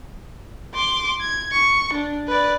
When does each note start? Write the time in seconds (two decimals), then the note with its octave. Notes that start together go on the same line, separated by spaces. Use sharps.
0.74 C6 D6
1.21 G#6
1.52 C#6
1.94 D4
2.27 B4 D5